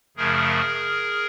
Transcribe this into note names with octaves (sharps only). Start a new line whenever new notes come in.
F#2 C#3 F3 A3 G#4 A#4